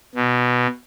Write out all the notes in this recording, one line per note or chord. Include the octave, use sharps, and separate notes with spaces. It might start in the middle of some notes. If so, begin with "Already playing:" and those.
B2